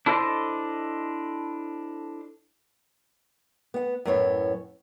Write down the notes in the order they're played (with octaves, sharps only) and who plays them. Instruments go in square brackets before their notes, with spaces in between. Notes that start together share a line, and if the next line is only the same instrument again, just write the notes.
[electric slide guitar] D4 E4 A4 C5 C#5 D#5
[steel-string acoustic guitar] B3 F#5
F#2 A2 B3 C#5